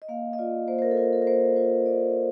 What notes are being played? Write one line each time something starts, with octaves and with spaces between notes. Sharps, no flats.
D#5
A#3 F5
D#5
F4 D5
A#3 C5
C5
A#4
A4
F4 A#4
A4
A#4
A#3 C5
F4 C5
A#3 D5
F4